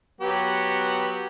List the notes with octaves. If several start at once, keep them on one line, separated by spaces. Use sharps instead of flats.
F#3 B3 G4